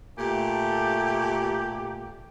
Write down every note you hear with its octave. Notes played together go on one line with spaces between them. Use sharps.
A#2 A3 G4